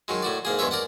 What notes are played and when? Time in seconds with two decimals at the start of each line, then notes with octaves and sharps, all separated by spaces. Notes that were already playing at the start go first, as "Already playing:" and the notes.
0.08 D#3 F#3 G#3
0.23 A2 F#4 D5
0.45 G#2 A#3 G#4
0.59 E2 G2 G#3 C#5 E5
0.71 A#4 D5 F#5